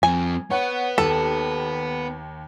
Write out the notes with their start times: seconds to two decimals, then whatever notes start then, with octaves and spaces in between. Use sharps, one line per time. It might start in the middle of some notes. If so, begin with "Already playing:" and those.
0.03 F2 C4 G#5
0.50 B3 C#5 F#5
0.98 D#2 A4